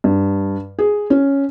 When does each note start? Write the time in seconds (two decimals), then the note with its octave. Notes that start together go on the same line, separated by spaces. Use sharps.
0.04 G2
0.79 G#4
1.10 C#4